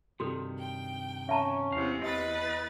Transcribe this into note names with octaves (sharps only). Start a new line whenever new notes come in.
G2 C3 D#3 F#4 A4
G5
C#4 E5 A5 A#5
E2 C3 F5
E2 B4 D#5 A6